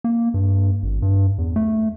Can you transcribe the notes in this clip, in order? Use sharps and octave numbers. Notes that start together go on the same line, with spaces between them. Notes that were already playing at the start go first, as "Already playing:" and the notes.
A#3
G2
G#1
G2
E2
A3